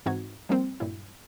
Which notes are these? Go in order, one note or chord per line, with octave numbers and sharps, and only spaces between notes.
G#2 E3 C4 D#4 F#4 G#6
F3 G3 A#3 C4
G2 A#2 F#3 E4